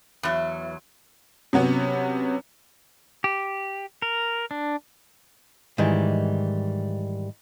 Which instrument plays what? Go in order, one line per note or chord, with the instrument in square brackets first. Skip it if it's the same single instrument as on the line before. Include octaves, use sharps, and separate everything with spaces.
[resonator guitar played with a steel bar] E2 F#3
[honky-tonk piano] C3 F#3 B3 C#4
[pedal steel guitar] G4
A#4
D4
[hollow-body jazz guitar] G#2 D#3 E3 G3